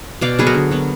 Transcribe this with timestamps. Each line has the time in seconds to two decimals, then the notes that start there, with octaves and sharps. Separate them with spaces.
0.21 B2 D5 F5
0.39 F#3 B3 G#4 B4
0.47 F#4 A#4
0.54 D3
0.71 F#3 B3